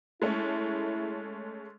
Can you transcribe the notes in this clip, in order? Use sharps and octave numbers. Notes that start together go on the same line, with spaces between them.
G#3 A3 C#4 E4